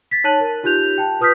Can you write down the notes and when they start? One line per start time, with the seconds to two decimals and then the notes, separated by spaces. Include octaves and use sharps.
0.11 A6 B6
0.24 D#4 C#5 A5 F#6 D#7 F#7
0.40 A#4
0.63 D#4 F4 G4 F#6 G6 F7
0.98 G5 A5
1.20 F4 B4 D#6 F6 G6 B6